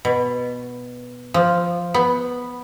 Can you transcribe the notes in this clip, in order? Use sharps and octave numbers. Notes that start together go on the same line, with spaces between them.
B2
F3
B3